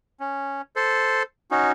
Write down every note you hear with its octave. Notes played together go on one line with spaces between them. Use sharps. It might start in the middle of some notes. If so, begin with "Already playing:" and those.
C#4
A4 C5
C#4 D#4 F#4